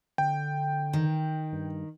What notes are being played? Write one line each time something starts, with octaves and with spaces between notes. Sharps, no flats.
D3 G5
D#3
G2